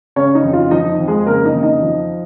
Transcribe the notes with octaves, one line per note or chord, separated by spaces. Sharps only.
C#3 C#4 C#5
D#4
F2
F4
F3 D#4 D#5
F2
G#3 G#4
C#3 A#3 A#4
D#4 D#5
F2
D#4 D#5
F3